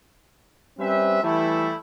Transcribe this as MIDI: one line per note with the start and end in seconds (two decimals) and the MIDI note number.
0.79 1.20 55
0.79 1.20 60
0.79 1.20 61
0.79 1.20 71
0.79 1.20 72
0.79 1.20 76
1.23 1.75 52
1.23 1.75 55
1.23 1.75 57
1.23 1.75 64